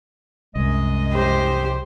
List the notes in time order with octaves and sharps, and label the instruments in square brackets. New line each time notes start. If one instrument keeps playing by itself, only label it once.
[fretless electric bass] C2 [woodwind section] F#2 G#3 D#5
[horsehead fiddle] G4 C5